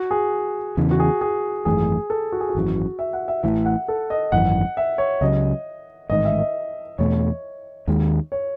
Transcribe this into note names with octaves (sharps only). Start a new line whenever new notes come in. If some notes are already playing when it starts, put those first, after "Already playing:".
Already playing: F#4
G#4
E2 C#3 E3
F#4
G#4
G#4
G#1 F#2 E3 A3 G#4
A4
F#4
G#4
F#4
G#1 F#2 E3
E5
F#5
E5
A1 A2 E3 E5
F#5
A4
D#5
G#1 F#2 E3 F#5
E5
C#5
C#2 C#3 F#3 D#5
A1 G#2 D#3 D#5
E5
D#5
E2 B2 A3 C#5
D#2 D#3 G#3
C#5